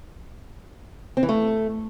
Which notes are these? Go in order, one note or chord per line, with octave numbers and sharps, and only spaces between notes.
C4
E3
A3